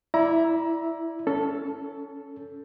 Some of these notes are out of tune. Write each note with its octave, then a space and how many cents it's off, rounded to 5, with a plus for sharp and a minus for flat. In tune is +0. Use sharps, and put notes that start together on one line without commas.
E4 +0 D5 +0 A#5 +25
C#4 +25 A4 +0